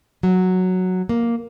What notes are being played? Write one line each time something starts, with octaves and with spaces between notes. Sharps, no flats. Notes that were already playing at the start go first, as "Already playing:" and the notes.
F#3
A#3